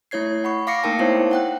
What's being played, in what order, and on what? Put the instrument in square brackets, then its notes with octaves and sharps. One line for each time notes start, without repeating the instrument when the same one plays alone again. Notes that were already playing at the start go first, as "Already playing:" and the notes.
[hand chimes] A3 E4 C#5 G#6 C7
F#5 B5 C#6
F5 D6 A#6 C7 C#7
A3 A#3 D#4 A#4 G5 A5
B3 D#4 E4 C5 C#5
F#5 G5 F#6